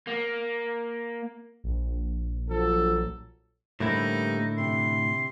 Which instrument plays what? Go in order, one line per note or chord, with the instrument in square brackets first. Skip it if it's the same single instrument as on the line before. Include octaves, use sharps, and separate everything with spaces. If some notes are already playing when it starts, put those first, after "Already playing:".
[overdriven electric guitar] A#3
[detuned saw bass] A#1
[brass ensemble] F3 F#3 A4
[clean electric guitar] A2 D3 E4 [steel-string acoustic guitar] G3 A#3 C5 [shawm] D#4
[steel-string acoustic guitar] C3 [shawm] C6